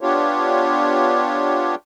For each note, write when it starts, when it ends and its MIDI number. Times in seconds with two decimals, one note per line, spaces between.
0.01 1.75 59
0.01 1.75 62
0.01 1.75 65
0.01 1.75 67
0.01 1.75 73